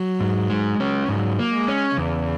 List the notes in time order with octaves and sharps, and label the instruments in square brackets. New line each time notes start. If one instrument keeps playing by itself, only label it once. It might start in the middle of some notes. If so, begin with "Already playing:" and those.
Already playing: [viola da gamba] F#3
[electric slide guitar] G#2
G#3
C#4
[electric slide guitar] G#2 [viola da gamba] F#3
[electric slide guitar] A#3
[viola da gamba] G#3
[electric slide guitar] C#4
[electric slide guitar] E2 [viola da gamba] C#3